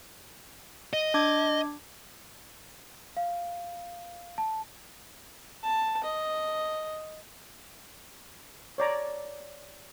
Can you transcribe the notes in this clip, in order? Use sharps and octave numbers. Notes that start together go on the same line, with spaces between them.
D#5
D4 D6 G#6
F5
A5
A5
D#5
C#5 D5 A#5